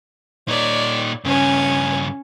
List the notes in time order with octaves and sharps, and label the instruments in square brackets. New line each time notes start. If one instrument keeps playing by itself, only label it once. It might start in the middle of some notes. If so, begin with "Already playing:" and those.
[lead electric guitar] A#2 D#4 [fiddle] C#5 D5
[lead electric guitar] G2 C#3 [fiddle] C#4 C#5